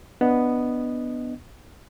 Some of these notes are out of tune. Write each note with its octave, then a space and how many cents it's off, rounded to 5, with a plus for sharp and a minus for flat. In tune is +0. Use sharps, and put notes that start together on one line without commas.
B3 +0 D4 +0 D#5 +0